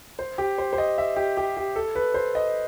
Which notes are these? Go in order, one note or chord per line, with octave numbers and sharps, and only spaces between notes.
C5
G4
C5
C5
D#5
E5
G4
G4
G4
A4
B4
C5
D#5